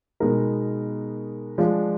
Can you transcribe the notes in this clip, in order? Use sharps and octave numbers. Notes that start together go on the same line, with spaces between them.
B2 G#3 B3 D#4 A#4
F3 G#3 D4 F4